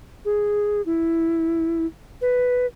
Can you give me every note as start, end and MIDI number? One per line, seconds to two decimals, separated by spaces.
0.25 0.81 68
0.86 1.86 64
2.21 2.66 71